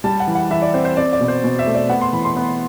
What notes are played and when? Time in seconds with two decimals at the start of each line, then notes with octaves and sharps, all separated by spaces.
0.04 G3 A5
0.20 F#5
0.27 E3
0.35 F#5
0.51 E3 E5
0.62 D5
0.74 C4 C5
0.85 C5
0.97 C4 D5
1.13 D5
1.20 B2
1.28 C5
1.44 B2
1.59 E5
1.66 A3
1.75 D5
1.90 B3 F#5
2.01 C6
2.13 E3 B5
2.25 C6
2.37 B3